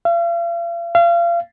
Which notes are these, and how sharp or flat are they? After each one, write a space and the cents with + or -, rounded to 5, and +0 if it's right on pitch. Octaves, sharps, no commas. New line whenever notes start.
F5 -45
F5 -35